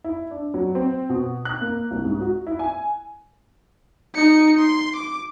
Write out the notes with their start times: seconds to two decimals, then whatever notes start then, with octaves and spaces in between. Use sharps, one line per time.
0.04 E4
0.31 D4
0.54 F#3
0.75 C4
1.09 B2
1.45 F#6
1.61 A#3
1.91 C2
2.05 G#2
2.21 F#4
2.47 E4
2.59 G#5
4.15 D#4 C#7
4.59 C6
4.96 D6